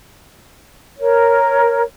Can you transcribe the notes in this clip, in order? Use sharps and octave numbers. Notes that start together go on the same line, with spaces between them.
A#4 C#5